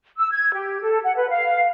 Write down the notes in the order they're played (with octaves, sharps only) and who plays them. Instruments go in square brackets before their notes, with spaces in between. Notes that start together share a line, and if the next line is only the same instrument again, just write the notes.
[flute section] E6
G#6
G4
A4
F#5
B4
F5